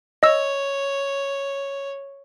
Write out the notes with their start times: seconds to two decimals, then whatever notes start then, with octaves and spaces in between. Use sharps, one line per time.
0.23 C#5 D#5 E6